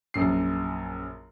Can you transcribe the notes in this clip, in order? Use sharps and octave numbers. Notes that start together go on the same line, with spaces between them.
A#1 F#2 C7